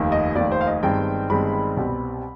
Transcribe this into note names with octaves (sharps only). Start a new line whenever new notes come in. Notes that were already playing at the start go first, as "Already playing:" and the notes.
Already playing: F1 D#2 D#3
D#5
F1 D#2 D#3 D5
C5
F5
D#5
G1 G2 D#3 G#3 C4 G5
G1 G2 D#3 G#3 C4 B5
C2 B2 G3 C4